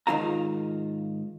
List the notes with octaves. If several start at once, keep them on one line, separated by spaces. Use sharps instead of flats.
G#2 D#3 C#4 F4 F5 A#5